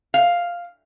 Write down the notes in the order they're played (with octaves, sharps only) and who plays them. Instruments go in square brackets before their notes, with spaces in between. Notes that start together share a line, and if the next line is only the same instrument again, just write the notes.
[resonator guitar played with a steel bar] F5